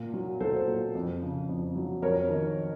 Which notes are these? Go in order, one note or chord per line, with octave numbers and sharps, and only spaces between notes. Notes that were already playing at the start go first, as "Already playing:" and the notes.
Already playing: A#2
F#3
F#3 A4 C5
A#2
F2
C#3
F2
F#3
F2 A#4 C#5
D#3